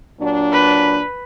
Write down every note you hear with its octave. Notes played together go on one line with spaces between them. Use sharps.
A#2 F#3 D4
B4